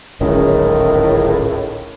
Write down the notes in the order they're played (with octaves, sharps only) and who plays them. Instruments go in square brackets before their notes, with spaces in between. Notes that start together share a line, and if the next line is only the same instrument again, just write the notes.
[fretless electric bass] D1 G#1 C#4 [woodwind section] C#2 A2 [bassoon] D#3